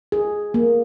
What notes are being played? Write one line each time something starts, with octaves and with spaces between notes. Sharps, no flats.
G#4
A#3